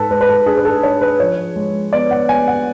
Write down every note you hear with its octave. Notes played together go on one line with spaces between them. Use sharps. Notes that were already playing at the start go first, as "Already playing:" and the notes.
Already playing: G#2 A4 B4
G#3 B4
B4
A4
D4 G#4
B4
A4
D4 C#5
B4
F3 C#5
G#3
B3 D5
F#5
B3 G#5
F#5